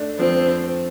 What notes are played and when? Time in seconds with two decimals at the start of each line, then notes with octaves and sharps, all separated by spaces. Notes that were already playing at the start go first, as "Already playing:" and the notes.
Already playing: A3 D4
0.19 F3 C4